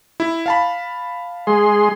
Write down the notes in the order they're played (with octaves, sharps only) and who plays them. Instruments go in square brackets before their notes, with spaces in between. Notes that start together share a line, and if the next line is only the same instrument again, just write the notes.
[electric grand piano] E4
F5 A5 B5
[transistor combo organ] G#3 G#4 C6